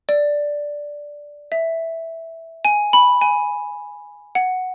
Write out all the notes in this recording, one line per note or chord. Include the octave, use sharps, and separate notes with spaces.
D5
E5
G#5
B5
G#5
F#5